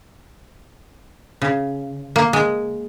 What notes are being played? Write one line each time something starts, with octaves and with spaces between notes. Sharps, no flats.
C#3
A#3
G#3